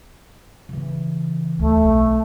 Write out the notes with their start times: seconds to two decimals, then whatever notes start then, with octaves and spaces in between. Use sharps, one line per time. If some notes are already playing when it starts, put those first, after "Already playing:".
0.69 C#3 E3
1.59 D2 A3
1.82 B1 F2